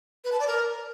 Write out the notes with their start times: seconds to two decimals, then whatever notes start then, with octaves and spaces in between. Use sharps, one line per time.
0.24 B4
0.32 A5
0.40 D5
0.47 A#4